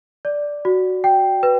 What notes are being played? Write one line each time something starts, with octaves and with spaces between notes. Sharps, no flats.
D5
F#4
G5
B4